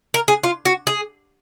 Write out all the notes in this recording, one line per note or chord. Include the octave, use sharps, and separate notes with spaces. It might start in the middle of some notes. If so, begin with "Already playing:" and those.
A#4
G#4
F4
F#4
G#4